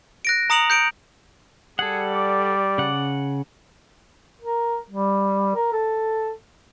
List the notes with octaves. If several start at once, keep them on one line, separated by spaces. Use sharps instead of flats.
F#6 A#6 D7
A#5 D#6 C#7 F7 F#7
G6 C#7 D7
G3 G#4 A4 F#5
D5
C#3 F#5
A#4
G3
A#4
A4